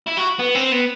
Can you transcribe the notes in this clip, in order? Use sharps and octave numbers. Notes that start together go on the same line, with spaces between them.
E4
F#4
B3
C4
B3